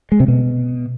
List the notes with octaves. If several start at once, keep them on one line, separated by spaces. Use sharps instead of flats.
G#3
C3
B2